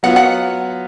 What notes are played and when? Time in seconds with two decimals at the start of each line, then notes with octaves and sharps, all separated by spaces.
0.03 F#3 B3 F4 F#5
0.16 F#5